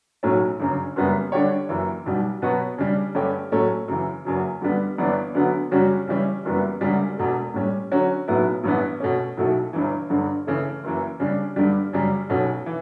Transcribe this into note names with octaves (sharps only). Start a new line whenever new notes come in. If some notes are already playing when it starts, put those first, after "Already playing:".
B1 A2 F#3 C#4
G1 F#2 C#3
F#1 F#2 C#3 G3 B3
D3 G3 D4 G4 C#5
F#1 F#2 E3
B1 B2 G3
B2 F#3 B3 F#4 C#5
C#3 G3 D4
G2 D3 A3 C#4 G4
A2 F#3 A3 C#4
F#2 C#3 E3
F#1 E2 C#3 F#3
G2 D3 G3 B3
G1 G2 E3 B3 D4
D2 D3 F#3 B3
F#2 C#3 G3 C#4 F#4
C#3 E3 G3 C#4
F#1 F#2 E3 G3 B3
E1 D2 C#3 G3
E1 E2 B2 A3
A2 G3 C#4
D3 F#3 C#4 F#4
B1 A2 F#3 B3 E4
A1 G2 E3 B3
B2 A3 C#4
B1 B2 A3 E4 A4
G1 G2 E3
G1 G2 D3
C#3 E3 A3
F#1 F#2 E3
C#3 G3 D4
G2 D3 G3
F#2 C#3 G3
B1 B2 A3 C#4
E3